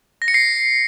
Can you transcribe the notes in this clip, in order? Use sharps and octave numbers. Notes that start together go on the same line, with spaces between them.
A#6
C#7
C7